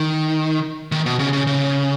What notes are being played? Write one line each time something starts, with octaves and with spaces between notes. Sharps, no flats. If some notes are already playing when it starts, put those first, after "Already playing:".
Already playing: D#3
D#3
B2
C#3
C#3
C#3